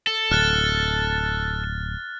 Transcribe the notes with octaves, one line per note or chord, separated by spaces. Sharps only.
A4
D1 F6 F#6 A6